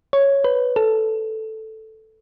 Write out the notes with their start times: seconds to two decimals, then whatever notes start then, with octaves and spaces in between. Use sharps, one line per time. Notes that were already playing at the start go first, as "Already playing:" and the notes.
0.13 C#5
0.44 B4
0.76 A4